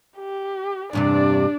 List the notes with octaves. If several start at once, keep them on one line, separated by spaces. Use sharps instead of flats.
G4
E2 G2 C3 D4 D5